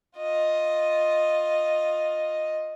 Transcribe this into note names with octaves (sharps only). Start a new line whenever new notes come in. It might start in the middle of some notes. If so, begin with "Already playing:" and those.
F4 D#5